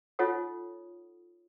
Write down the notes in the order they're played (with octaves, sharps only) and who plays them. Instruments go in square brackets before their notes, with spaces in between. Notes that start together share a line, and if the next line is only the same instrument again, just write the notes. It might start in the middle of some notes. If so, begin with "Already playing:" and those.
[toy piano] D#4 F4 A4 C#5 F#5 D#6